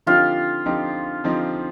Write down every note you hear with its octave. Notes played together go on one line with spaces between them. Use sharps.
D3 F3 C4 D#4 F4 G4
D3 F3 C4 D#4 G4
D3 F3 C4 D#4 G4